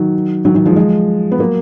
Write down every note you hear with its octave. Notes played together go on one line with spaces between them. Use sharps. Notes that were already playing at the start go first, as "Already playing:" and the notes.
Already playing: D#3 F#3
D#3 F#3
D#3 F#3
F3 G#3
F3 G#3
B3
F#3 A#3